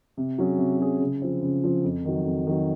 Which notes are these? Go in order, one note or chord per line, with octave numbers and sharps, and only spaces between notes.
C3
F#3 C#4 G#4
C3
F#3 C#4 G#4
C#3
F3 C4
C#3
F3 C4
F2
D#3 F#3
F2
D#3 F#3